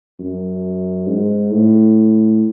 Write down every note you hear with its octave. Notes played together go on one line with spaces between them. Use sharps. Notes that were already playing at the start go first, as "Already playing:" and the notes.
F#2
G#2
A2